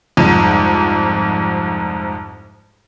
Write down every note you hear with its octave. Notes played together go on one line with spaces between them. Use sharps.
C2 F2 G#2